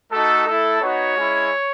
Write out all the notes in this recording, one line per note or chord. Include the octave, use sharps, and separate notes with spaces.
A3 D#4 F#4 A4
A3 E4 A4
B3 D#4 F#4 C#5
G#3 C#4 E4